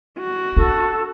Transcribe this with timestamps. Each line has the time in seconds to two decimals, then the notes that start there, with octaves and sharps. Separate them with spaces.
0.19 F#4
0.57 D4 A4